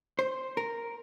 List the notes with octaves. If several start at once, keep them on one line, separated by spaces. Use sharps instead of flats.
C5
A#4